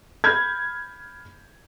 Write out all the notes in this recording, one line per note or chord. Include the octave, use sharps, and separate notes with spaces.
B5 F6 G6 G#6